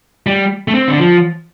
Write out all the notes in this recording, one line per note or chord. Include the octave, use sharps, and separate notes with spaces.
G3
A3
C4
D3
F3